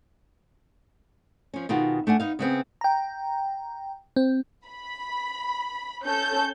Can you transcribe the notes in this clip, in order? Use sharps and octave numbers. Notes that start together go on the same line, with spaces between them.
F3 C#4
B2 D#3 F4 G#4 F#5
A3 D4 F#5 G#5
B3 D#4 F5
C#3 B3 C4 G#4
G5 A#5
C4
B5
C#4 A4 G6